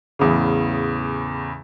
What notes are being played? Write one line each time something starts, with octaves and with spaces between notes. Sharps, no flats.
E2 A2 C#3